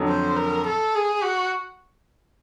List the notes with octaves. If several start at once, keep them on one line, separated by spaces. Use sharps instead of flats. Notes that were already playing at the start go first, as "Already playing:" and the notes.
Already playing: F2 D3 F#3
C5
A#4
A4
G#4
F#4